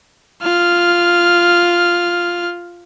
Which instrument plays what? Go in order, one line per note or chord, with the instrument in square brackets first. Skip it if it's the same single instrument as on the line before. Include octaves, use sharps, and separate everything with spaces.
[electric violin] F4 F6